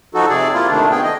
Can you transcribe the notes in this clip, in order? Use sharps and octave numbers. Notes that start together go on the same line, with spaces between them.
F3 D#4 F#4 A4
C3 G#4 D5
A#3 E4 F4
C3 D#3 A3 D4
A3 B3 G#4 G5
D#5